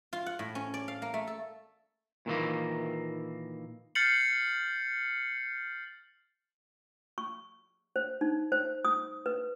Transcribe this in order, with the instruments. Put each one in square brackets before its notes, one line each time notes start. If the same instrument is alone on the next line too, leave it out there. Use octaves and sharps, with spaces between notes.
[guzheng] F4
F#5
A2
C#4
D5
F5
A#3
A3
A4
[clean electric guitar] A#2 D#3 E3 A#3
[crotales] F6 G6 A6 C7 C#7 F#7
[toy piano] C#6
C5
D#4
C5
D#6
B4